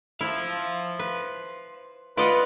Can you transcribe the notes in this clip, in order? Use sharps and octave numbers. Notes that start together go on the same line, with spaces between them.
E4 C5 F5
B4
F4 B4 D5 D#5 F#5